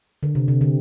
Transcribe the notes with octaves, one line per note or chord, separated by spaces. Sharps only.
D3
C3
C3
D3